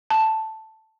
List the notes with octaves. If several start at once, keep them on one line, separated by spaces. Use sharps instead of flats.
A5